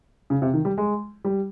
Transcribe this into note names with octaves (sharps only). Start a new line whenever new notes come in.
C#3
C3
D#3
G3
G#3
G3